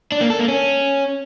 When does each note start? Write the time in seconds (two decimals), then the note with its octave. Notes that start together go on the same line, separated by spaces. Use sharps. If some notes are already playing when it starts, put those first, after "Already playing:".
0.12 D4
0.21 A#3
0.30 A4
0.39 A#3
0.48 C#4